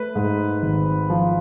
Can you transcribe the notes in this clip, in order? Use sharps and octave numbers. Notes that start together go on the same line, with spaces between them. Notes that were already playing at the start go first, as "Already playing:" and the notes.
Already playing: A3 B4
G#2
G#1
F3